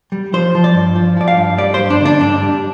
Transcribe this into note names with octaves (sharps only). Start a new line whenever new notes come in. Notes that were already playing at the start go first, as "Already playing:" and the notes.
G3
F3 C5
F3
D5
G2
F3
F3 D5
F5
G2
G3 D5
C5
G2
D4
D3 D4
G2 D4
G3